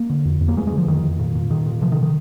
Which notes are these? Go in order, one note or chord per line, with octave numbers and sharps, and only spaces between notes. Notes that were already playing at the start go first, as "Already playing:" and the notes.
Already playing: A#3
D3
F2
F2
A#3
F2 G#3
G#3
D3
F3
F2 D#3
F2
A#2
A#2
A#2 D#3
A#2
C3 F3
D#3
D#3